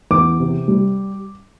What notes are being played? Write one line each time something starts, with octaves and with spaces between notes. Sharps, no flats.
E2 D6
C3
G3